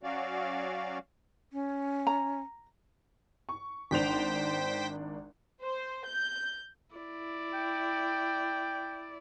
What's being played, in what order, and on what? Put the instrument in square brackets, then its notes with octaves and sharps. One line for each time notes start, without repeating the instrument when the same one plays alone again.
[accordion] F#3 C#4 F#4 D5 F5
[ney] C#4
[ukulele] A#5
[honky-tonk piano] C#6
[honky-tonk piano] G#1 D4 F7 [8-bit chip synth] C5 G5 B6
[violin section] C5
G6
[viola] E4 D5
[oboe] G5